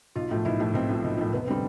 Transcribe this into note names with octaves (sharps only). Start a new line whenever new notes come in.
B1 F4
A2 F3
B1 E4
A2 F3
B1 C4
A2 F3
B1
A2 F3
F1 B3
D3 G3 C4